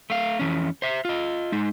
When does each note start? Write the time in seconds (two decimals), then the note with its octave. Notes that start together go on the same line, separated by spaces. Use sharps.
0.10 A3 F5
0.39 F2 E3 C#4
0.82 C5 E5
1.05 F4 D#5
1.52 G#3 D#4